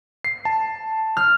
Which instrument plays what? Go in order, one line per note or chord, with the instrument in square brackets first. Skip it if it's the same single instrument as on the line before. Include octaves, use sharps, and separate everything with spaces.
[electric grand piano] C7
A5
[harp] F6